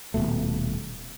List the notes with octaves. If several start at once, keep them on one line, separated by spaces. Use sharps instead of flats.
D#1 C#2 B2 A3